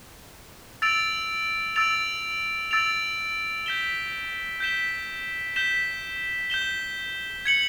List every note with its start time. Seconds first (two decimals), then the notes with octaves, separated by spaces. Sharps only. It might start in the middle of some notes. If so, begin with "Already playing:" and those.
0.82 E6 A6 D7 F7
1.76 E6 A6 D7 F7
2.71 E6 A6 D7 F7
3.66 G6 B6 E7 G7
4.60 G6 B6 E7 G7
5.56 G6 B6 E7 G7
6.50 G6 B6 E7 G7
7.46 G#6 C#7 F#7